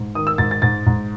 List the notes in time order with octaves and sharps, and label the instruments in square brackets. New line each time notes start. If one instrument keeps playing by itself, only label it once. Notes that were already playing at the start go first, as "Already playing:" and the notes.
Already playing: [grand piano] G#2
D#3 D#6
E6
G#2 A6
A6
G#2 A6
G#2